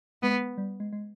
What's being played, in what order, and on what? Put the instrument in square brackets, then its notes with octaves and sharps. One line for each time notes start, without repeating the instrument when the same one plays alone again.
[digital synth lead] G#3 [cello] B3
[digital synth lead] G3
G#3
G#3